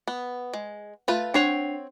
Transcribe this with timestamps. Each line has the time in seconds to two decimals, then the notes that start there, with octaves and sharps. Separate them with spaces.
0.08 B3
0.54 G#3
1.08 A3 F4 B4
1.34 C4 D4 C#5 F#5 C7 F7